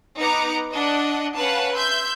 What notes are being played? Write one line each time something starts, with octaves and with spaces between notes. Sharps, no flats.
B3 D#4 A#5 D6 C#7
D4 D#5 F#5
C#4 B4 F5 F#5 A5
E5 C6 G6